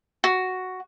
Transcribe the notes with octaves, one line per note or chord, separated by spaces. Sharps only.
F#4